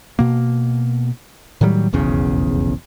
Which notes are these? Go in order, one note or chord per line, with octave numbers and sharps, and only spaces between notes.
B2 A#3
A2 D#3 F#3 G3
F1 B1 E2 C#3